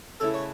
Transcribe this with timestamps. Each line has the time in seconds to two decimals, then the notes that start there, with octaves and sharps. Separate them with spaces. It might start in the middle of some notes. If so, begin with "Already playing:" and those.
0.20 C#3 A3 E4 A4 B4
0.34 C#5